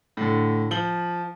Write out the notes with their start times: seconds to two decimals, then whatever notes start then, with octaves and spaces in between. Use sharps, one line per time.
0.17 A2 D3
0.71 F3 F#7 G7